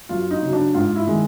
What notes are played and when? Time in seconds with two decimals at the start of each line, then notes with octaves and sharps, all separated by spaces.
0.09 F#2 F4
0.31 D#4
0.42 C#3 F#3
0.53 D4
0.74 G#2 F4
0.96 E4
1.07 D#3 G#3